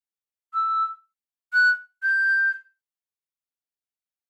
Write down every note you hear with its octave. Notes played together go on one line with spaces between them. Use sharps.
E6
F#6
G6